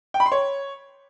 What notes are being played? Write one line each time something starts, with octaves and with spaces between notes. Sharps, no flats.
G5
B5
C6
C#5